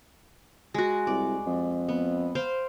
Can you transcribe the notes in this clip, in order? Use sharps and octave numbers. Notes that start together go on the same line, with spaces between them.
G#3 F#4
C2 D5
F2
B3
C5 F5 G5